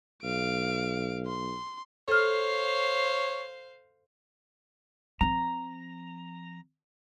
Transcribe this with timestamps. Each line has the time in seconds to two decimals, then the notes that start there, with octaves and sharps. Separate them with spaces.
0.23 B1 F5 D7
1.27 C6
2.08 A4 C5 C#5 F5 F6
5.21 F3 C4 A#5